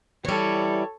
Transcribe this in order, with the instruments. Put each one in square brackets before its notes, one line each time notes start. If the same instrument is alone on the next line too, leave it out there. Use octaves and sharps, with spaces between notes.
[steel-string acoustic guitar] E3 G3 [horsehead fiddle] A4 C#5